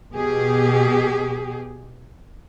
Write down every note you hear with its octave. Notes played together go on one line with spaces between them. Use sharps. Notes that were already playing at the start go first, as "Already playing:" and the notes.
B2 G4 G#4